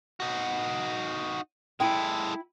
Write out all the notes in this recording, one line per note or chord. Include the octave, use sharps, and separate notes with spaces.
D#4 F#4
G#3 E4 A4 G5